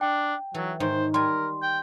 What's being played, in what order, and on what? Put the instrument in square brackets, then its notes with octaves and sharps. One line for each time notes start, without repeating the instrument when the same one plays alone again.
[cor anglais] D4 [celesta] G5
[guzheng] E3 A4 [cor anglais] F#3
[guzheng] G#2 D#3 C#5 [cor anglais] C5
[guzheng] G3 G#5 [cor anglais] A#4 [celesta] C6
[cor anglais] G5